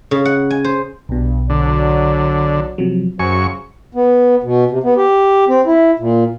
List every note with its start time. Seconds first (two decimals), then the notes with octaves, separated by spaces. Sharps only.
0.11 C#3
0.25 F#5
0.50 G#5
0.65 C5
1.09 B1 G2 B2
1.50 D3 F#3 D5
2.78 C3 F3 F#3
3.19 F#2 C#3 C5 G#5 C#6
3.95 B3
4.43 B2
4.70 C3
4.84 B3
4.97 G4
5.49 C4
5.66 E4
5.99 A#2